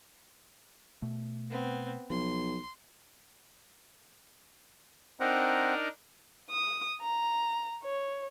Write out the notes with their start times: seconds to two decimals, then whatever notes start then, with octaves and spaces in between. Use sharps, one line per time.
1.02 B2 A3
1.50 B3 C4
2.10 B1 F3 C6
5.20 C4 D4 D#4 A#4 C5 F#5
6.50 D#6
7.01 A#5
7.83 C#5